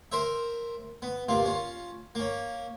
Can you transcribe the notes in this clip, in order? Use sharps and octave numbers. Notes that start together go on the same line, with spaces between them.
A#4 C5 E5
B3
C3 A#3 F4
C#4 F4
A#3 C#4